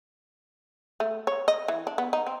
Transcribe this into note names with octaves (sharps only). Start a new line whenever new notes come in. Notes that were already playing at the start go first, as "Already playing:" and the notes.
A3
C#5
D#5
E3
D4
B3
D#4
C4